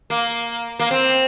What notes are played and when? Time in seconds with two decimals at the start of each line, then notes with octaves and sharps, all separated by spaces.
0.10 A#3
0.79 A#3
0.91 C4